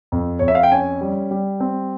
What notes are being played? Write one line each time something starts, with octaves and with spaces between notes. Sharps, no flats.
F2
F2 C#5
E5
F5
G5
C#4 G#5
G3
G3
C4